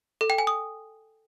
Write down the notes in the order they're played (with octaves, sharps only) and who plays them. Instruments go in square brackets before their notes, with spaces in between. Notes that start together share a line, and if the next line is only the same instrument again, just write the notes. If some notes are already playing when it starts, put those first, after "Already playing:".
[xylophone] A4
G5
G#5
D#6